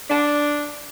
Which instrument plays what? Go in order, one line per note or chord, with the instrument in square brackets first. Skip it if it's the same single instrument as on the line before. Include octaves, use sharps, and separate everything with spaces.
[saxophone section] D4